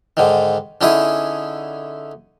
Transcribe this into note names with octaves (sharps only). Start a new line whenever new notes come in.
G#2 D3 D#3
D3 C#4 D#4 E4 G#4 D#6